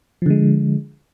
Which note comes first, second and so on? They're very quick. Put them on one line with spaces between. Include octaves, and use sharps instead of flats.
F3 D3 G#3